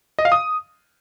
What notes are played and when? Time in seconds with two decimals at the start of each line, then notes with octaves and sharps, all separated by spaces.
0.19 D#5
0.25 F5
0.32 D#6